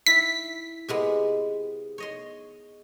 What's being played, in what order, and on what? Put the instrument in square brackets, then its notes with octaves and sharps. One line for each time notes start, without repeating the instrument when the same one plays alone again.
[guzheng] E4 [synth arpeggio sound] B6
[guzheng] C3 G#3 B3
C#5 D#5 C6